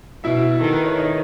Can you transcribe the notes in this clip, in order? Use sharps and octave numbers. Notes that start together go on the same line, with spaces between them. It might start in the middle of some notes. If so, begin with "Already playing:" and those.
B2 E4 E5
D#3 A4
B4
C#5
D#4 D#5